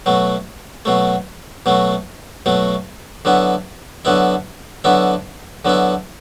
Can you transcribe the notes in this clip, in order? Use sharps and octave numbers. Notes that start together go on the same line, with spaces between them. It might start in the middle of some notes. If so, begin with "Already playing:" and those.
B2 F#3 A3
B2 F#3 A3
B2 F#3 A3
B2 F#3 A3
D3 F#3 B3 E4
D3 F#3 B3 E4
D3 F#3 B3 E4
D3 F#3 B3 E4